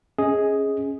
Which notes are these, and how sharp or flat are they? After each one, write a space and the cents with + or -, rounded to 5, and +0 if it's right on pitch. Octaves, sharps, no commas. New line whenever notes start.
C#4 -10 G#4 +0 D#5 +25